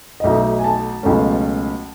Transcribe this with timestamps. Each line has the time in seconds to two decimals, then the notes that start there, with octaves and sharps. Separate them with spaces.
0.20 D#5
0.24 B1 B2 F#3 A3 D#4 E5
0.59 G#5
0.64 A5
1.03 C#2 B2 F#3 A3 C#4